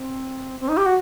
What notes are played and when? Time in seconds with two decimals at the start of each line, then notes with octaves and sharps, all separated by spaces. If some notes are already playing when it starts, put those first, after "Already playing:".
Already playing: C4
0.60 C4
0.68 D#4
0.77 G4
0.86 F#4